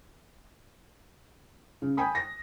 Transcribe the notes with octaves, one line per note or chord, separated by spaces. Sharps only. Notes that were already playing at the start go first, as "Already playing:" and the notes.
C#3
G5 G#5 B5 D#6
A#6